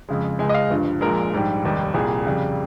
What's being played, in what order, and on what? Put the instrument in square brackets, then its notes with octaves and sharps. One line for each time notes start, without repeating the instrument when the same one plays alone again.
[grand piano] F2 C#3 G#3
C#2 C#3 G#3 G#5
D#5
F5
G1 G2 F3
A#1 A#2 G#3 A#4
A#1 G#2 G3
F1 D#2 D#3 G3
C2 A#2 G3 G#4
F2 C#3 G3